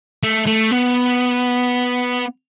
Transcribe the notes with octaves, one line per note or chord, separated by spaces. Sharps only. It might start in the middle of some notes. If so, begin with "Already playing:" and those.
A3
A3
B3